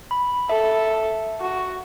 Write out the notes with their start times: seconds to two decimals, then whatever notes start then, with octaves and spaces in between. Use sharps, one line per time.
0.11 B5
0.49 A4 E5
1.41 F#4